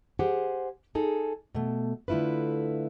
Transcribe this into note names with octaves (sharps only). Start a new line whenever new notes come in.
G4 G#4 C5 F#5
D#4 G#4 A4
B2 A3
D3 A3 E4 F4 B4